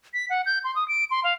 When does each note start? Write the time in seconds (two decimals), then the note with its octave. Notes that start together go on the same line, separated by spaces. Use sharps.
0.14 B6
0.30 F#5
0.46 G6
0.64 C6
0.76 D#6
0.88 D7
1.11 C6
1.24 F5